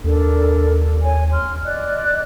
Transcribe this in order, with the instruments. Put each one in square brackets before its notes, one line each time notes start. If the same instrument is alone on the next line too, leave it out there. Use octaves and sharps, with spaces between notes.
[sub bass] D#2 [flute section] D4 A4 A#4
[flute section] C#5 G#5
C6 F6
D5 D#5 F#6